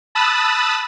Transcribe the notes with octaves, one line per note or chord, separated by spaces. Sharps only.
A5 B5 D#6 E6 F#6 A6